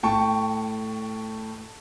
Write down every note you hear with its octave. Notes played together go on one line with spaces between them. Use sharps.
A2 G5 A5 C#6